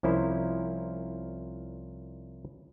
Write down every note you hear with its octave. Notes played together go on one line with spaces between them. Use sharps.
C2 F3 C#4 E4 A#4 C5